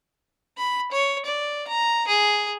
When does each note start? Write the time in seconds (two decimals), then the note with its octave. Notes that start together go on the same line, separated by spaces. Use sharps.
0.58 B5
0.92 C#5
1.26 D5
1.68 A#5
2.08 G#4